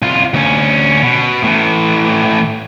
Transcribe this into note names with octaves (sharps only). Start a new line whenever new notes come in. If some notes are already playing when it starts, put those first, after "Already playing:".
C2 F4
D2 C#4
B2
A2 E3